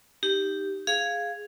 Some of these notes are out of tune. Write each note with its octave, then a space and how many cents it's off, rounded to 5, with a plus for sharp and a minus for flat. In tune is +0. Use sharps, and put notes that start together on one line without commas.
D#4 +0 G4 +0
G#4 +0 F5 +0